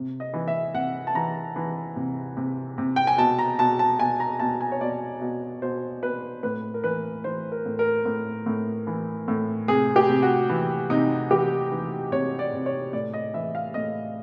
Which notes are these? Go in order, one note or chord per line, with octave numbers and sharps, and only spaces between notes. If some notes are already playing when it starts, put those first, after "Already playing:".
Already playing: C3
D#5
E3
E5
C3 F#5
A5
E3 A#5
E3
C3
C3
C3
G5
G#5
B2 A5
A#5
B2 A5
A5
B2 G#5
A#5
B2 A5
G#5
C#5
B2 D5
B2
B2 C5
B2 B4
A2 B4
A#4
E3 B4
E3 C5
A#4
A2
A#4
A2
A2
E3
A2
C3 G#4
G4
C3
F#4
E3
C3 D#4
E3 G4
E3
C3 C#5
D5
C3
C#5
A2 D5
D#5
E3 E5
F5
A2 D#5